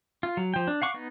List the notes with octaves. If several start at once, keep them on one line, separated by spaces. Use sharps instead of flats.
F4
F#3
F3 G5
D4
F5 F#5 C#6 D6
B3 D#4